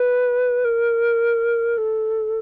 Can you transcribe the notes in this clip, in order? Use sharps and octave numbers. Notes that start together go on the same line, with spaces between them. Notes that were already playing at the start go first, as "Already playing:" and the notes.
Already playing: B4
A#4
A4